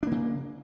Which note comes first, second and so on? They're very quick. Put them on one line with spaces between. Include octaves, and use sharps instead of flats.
D4 A#3 C#3